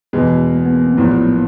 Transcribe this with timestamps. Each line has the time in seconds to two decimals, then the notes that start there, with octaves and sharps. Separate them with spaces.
0.13 E2 B2 G#3 B3
0.47 B3
0.55 A#3
0.66 B3
0.76 A#3
0.86 C4
0.97 A#1 A2 F#3 B3
1.27 A#3